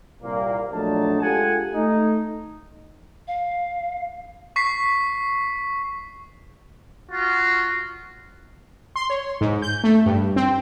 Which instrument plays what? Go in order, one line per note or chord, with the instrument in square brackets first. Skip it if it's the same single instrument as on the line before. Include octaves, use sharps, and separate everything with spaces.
[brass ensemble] C2 A#2 A#3
A#1 F#3 A3 D4 D#4 A5
G#3 F4 G4 A4 F#5 G#5
A3 D#4
[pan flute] F5
[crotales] C#6 B6 C7
[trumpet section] F4 F#4
[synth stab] C6
C#5
G#2
G6
A3
G2
C4